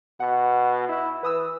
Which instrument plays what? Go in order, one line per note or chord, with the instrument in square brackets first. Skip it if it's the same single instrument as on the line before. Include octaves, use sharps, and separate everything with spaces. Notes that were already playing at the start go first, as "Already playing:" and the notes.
[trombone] B2 [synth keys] F#5
[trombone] E4
[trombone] E3 [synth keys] B4 D#6 E6